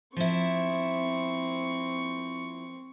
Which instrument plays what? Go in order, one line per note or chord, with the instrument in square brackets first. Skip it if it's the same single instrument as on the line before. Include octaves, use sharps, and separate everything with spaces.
[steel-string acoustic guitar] F3 E4 [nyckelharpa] C4 C#6